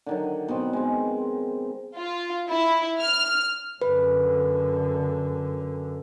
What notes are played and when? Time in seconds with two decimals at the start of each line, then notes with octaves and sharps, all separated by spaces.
0.06 D3 D#3 F#3
0.48 B2 C4
0.73 G#3 C5
1.96 F4
2.50 E4
3.01 F6
3.82 F#2 D3 B4